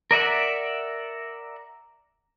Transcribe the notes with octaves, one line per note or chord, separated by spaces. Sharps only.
A#4 D5 E5 F#5